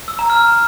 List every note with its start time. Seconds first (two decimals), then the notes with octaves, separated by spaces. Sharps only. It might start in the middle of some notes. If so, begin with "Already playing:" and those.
0.08 E6
0.19 A#5
0.30 F6